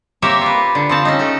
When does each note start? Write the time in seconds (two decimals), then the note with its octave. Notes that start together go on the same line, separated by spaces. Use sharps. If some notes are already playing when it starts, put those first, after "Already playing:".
0.22 A#3 C4 G4 A#4 C#5 E5
0.41 F4 B4
0.75 D3
0.89 F3 C4 A5
1.05 C#4 D#4
1.19 A3 A4